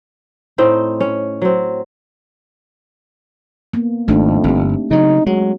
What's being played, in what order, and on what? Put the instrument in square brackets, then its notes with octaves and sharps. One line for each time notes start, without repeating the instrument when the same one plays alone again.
[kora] A2 C4 D#4
C#4
F#3 C4
[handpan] A#3 B3
[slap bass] G#1 [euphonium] F2 [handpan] A3 D4 D#4
[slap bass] G1 [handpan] C4 G4
[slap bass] C#3 F#3 [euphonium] D#4
[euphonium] F#3 [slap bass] G#3